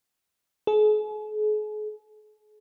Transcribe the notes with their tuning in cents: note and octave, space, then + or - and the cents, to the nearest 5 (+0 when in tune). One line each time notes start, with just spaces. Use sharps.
G#4 +40